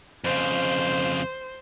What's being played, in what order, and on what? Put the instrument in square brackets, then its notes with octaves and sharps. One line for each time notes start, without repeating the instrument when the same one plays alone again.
[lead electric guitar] F2 C#3 [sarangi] C5